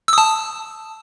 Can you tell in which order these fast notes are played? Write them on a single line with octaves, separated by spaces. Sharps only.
E6 D#6 A5